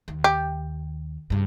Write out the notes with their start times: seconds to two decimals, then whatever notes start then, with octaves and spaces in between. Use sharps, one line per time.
0.08 D#2
0.24 G4
1.30 G2 C#3